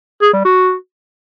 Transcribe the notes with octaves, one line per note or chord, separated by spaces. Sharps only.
G#4
G3
F#4